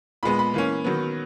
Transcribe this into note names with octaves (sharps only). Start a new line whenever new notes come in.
A#2 G#3 B3 B5
B5
E3 A#3 C#4
D#3 F#3 B3